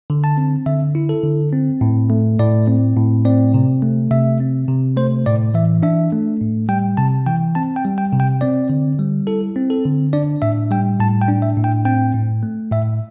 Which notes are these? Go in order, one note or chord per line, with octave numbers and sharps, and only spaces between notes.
D3
A5
C4
D3 E5
E4
A4
D3
C4
A2
A3
A2 D5
C4
A2
C4 D5
C3
A3
C3 E5
C4
C3
A3 C5
A2 D5
E3 E5
D4 E5
A3
A2
G3 G5
C3 A5
E3 G5
C4 A5
G5
G3
G5
C3
G5
C4 D5
D3
G3
E4 A4
C4
A4
D3
D4 D5
A2 E5
G3 G5
A2 A5
G5
D4
E5
A2
G5
C4 G5
A2
A3
A2 E5